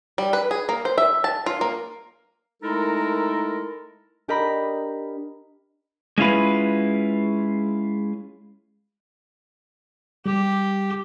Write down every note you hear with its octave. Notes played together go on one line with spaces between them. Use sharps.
G3
B4
G#4
A#3
C5
E5
A5
F4
A#3
G#3 A3 D#4 E4 A4 A#4
D4 G4 A#4 D#5 A#5 B5
G#3 C#4 E4 F4 B4
G3 G4